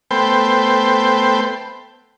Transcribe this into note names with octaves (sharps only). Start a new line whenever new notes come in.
A3 B3 C5 G5